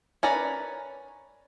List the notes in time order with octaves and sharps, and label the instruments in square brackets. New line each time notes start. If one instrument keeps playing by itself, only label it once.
[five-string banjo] C#4 A#4 B4 D5 A#5